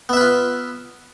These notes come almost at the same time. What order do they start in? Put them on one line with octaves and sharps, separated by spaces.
B3 E5 B4 F4